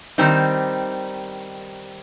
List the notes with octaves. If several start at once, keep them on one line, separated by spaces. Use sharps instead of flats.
D#3 G3 C4 D#4